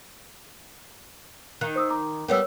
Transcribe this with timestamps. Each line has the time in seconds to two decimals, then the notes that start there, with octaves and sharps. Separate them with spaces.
1.61 D#3 F#6
1.76 C5 D#6 E6
1.90 A#5 D6
2.28 G3 B3 G4 A#4 C#5 E6